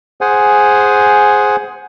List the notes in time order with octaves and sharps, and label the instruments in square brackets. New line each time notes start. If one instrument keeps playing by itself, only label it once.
[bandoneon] G#4 C5 F#5 G#5